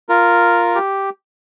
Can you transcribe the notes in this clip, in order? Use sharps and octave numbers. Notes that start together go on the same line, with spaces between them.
F4 A#4
G4